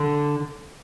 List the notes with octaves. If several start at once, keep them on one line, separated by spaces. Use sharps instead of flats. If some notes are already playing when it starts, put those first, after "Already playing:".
Already playing: D3